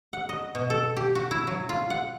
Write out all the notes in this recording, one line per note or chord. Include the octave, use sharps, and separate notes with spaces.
F#5
D#5
B2
A4
G4
F#4
E4
F#3
F4
F#5